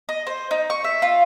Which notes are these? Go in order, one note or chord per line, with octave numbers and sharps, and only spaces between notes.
D#5
C5
D#4
C#6
E5
F4